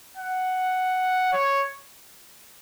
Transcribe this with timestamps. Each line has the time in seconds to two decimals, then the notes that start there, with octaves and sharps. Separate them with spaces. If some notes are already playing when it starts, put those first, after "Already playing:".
0.17 F#5
1.32 C#5